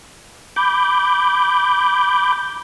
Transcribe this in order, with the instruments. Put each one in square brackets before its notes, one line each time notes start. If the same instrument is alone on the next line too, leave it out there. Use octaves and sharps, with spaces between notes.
[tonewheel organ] B5 D6 G6